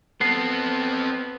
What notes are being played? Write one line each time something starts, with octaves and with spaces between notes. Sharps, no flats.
B3 C4 A4 C7